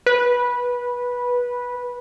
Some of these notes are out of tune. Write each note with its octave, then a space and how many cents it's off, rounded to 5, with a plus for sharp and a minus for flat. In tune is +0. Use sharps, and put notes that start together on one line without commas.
B4 -15